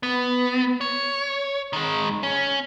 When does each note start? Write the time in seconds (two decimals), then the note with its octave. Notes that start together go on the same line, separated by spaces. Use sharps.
0.03 B3
0.81 C#5
1.73 D#3 G#3
2.23 C#4